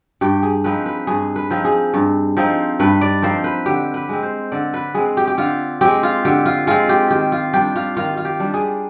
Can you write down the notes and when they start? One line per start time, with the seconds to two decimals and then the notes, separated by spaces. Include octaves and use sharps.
0.21 G2 G4
0.43 G#4
0.64 F3 C4 D#4 B4
0.86 B4
1.07 G2 G#4
1.36 B4
1.50 F3 C4 D#4
1.65 G#4
1.94 G2
2.37 F3 C4 D#4
2.80 G2 B4
3.01 D5
3.22 F3 C4 D#4 C5
3.44 B4
3.66 D3 G4
3.94 B4
4.09 G#3 C4
4.23 C5
4.52 D3 D5
4.74 B4
4.94 G#3 C4 G#4
5.17 G4
5.27 G4
5.38 D3 F4
5.81 G#3 C4 G4
6.03 F4
6.25 D3 G4
6.45 F4
6.67 G#3 C4 F4
6.89 G4
7.10 D#3 G4
7.32 F4
7.53 G3 D4 G4
7.76 F4
7.97 D#3 F4
8.17 F4
8.25 G4
8.40 G3 D4
8.54 G#4